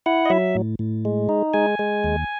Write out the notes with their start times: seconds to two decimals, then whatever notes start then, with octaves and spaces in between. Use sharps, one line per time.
0.06 E4 F#5
0.25 D#5
0.30 F#3 E5
0.55 A2
0.79 A2
1.05 G#3
1.29 D#4
1.54 G#3 G#5
1.79 G#3
2.04 D#2